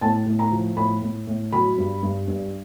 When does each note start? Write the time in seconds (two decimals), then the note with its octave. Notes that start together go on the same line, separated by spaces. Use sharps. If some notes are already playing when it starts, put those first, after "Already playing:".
0.01 A2 A5
0.26 A2
0.39 A#5
0.52 F3
0.77 A2 B5
1.02 A2
1.27 A2
1.52 F#3 B5
1.78 G2
2.03 G2
2.28 G2